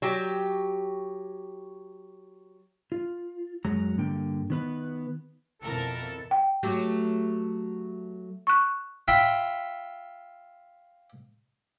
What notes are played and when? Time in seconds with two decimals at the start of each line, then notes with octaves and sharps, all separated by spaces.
0.02 F#3 G4
2.92 F4
3.65 F#2 F#3 G#3 C#5 A#5
3.97 G2 D3 A#3 G5
4.50 D#3 B3 B4
5.62 F2 B2 E3 A4 A#4 A5
6.31 G5
6.63 F#3 A3 G4
8.47 C#6 F#6
9.08 F4 E5 G5 B5